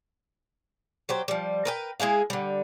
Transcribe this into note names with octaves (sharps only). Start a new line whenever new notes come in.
F#3 G4 C5
F3 G3
A#4 B4 G5
G#3 E4 G#4 F5
D3 G3